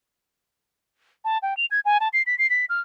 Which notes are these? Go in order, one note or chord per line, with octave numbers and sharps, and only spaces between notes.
A5
G5
F7
G#6
G#5
A5
C7
B6
C7
B6
F6